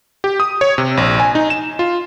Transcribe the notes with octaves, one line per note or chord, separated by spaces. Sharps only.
G4
D#6
C#5
C3
A#1
G#5
D#4
E7
F4